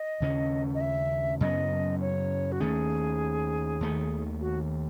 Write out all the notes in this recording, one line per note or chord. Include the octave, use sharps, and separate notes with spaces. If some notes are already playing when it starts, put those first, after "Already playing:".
Already playing: D#5
D#2 C#3 G#3 C#4
D#5
E5
F#2 C#3 F#3 B3 D#5
C#5
F#4
D#2 D#3 A3 C#4 G#4
D#2 D#3 A3
F#4